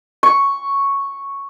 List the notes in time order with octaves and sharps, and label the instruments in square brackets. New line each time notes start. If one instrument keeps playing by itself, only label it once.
[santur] C#6